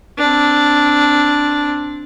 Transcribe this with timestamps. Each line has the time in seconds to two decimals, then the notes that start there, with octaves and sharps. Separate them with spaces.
0.18 C4 D4